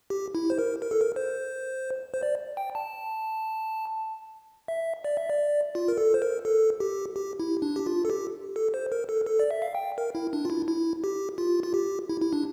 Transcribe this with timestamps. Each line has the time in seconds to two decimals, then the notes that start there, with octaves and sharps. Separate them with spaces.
0.10 G4
0.35 E4
0.50 C5
0.58 A#4
0.82 A#4
0.91 A4
1.01 A#4
1.16 C5
2.14 C5
2.23 D5
2.57 G5
2.75 A5
4.68 E5
5.04 D5
5.17 E5
5.30 D5
5.75 F4
5.88 A#4
5.98 A4
6.14 C5
6.22 A#4
6.45 A4
6.80 G4
7.16 G4
7.40 E4
7.62 D4
7.76 G4
7.86 F4
8.05 A4
8.10 G4
8.56 A4
8.74 C5
8.92 A#4
9.09 A4
9.26 A4
9.39 D5
9.51 E5
9.62 F5
9.75 G5
9.98 A#4
10.15 E4
10.33 D4
10.45 F4
10.50 E4
10.68 E4
11.04 G4
11.38 F4
11.63 F4
11.74 G4
12.09 E4
12.21 E4
12.33 D4